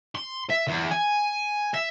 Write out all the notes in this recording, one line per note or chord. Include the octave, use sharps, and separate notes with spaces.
C6
E5
E2
G#5
E5